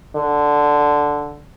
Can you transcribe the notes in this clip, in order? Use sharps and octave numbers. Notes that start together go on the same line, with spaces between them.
D3